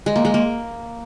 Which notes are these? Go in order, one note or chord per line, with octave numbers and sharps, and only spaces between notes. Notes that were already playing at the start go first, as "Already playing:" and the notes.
G#3
A#3
G#3
A#3